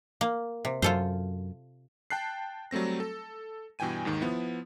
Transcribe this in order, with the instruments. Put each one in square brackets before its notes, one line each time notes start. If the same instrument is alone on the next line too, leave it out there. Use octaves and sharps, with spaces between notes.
[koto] A#3
C3
[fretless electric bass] F#2 [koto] F4 A4 C5
[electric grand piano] G5 A5 F#6 C7
F#3 G3 A3 C4 A#6
A4
G2 B2 E3 G5 G#5 D#7
D#2 G#2 D#3
F3 B3 E4